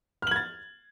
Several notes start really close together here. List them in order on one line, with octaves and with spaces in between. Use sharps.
F6 F#7 G#6 A6